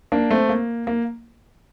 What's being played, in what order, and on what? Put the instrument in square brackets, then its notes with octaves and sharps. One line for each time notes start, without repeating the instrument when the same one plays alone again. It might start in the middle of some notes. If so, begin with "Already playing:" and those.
[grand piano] A#3 D4
A3 C4
A#3
A#3